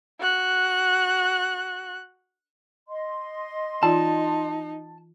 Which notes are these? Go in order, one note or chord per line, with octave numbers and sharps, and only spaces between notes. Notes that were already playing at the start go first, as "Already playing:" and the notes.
F#4 F#6
D#5 C6
E3 D#4 F4 D5 A5